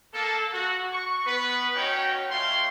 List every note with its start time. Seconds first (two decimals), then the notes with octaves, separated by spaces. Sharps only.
0.13 A#3 A4
0.53 F#4
0.92 C#6
1.25 B3 B4
1.76 C#4 D#4 F#4 C#5 G5
2.31 A3 F4 C#5 F5 G5 C6